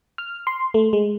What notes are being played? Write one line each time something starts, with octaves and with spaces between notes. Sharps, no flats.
F6
C6
A3
G#3